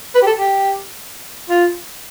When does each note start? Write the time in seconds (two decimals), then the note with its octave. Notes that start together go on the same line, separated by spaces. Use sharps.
0.15 B4
0.22 G4
0.27 A4
0.39 G4
1.50 F4